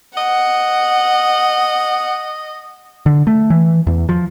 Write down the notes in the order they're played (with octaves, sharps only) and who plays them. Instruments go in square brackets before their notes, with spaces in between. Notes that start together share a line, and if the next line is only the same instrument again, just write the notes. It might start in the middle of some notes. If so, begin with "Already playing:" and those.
[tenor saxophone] D#5 [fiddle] F#5
[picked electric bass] D3
A3
E3
E2
F3